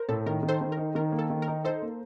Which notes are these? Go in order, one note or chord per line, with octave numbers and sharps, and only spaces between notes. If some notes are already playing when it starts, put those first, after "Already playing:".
Already playing: A#4 C5
A2 A4
D#3 A#4
D#3
A4 C5
D#3
A#4
D#4
D#3 A#4
A#3
A4
D#3
A#4
D#4
D#4 A4 C5
A#3